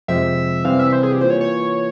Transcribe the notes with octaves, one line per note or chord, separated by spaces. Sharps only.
F2 C3 F3 G#3 C4 E5
C3 E3 G3 C4 F5
E5
C5
G#4
G4
E3 A#3 F4 C5
C#5
C#5